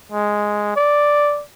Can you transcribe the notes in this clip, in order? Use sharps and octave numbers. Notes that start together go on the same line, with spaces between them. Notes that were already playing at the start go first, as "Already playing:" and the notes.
G#3
D5